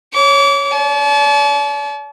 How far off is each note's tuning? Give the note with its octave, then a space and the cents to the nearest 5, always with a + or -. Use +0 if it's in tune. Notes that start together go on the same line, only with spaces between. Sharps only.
C#5 +0 D6 -35
D5 -45 A5 -40